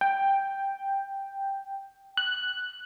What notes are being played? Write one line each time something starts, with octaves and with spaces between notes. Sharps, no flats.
G5
F#6